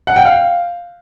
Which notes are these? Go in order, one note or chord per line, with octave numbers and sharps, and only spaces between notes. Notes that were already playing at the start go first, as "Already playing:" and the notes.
F#5
G5
F5